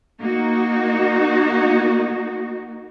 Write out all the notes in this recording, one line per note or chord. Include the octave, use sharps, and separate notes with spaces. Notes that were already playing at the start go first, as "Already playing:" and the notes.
A#3 D#4 F#4